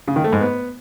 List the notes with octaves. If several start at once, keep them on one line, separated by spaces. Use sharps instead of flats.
C#3
D#3
A3
G#2
B3